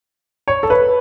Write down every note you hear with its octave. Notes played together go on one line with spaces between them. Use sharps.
C#5
A4
B4